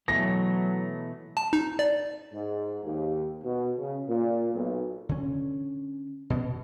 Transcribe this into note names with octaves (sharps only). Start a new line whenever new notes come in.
B2 E3 F#3 A3 A#6
A5
D#4
D5
G#2
D#2
B2
C#3
A#2
B1
D3 C#4
B2